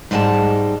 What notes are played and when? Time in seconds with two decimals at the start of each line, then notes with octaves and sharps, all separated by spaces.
0.11 G#2 G3 G#3 G#5 A5